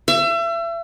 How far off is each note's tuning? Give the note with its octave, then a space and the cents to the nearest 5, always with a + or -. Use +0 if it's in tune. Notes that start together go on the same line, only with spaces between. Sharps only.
E5 +35